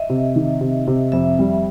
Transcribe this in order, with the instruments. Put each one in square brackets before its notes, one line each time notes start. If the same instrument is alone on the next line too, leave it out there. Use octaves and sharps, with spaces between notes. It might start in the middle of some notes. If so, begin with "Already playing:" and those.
Already playing: [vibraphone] D#5 E5
[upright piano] C3
D#3
C3
C3
[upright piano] F2 [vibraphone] E5
[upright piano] G3